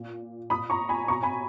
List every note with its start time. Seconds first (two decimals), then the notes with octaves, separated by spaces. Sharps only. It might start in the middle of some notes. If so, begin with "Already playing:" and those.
Already playing: A#2
0.50 A#2 B5 D#6
0.70 A#5 C#6
0.89 G#5 B5
1.08 B2 A#5 C#6
1.23 G#5 B5